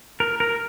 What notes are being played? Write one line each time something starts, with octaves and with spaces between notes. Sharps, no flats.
A#4
A#4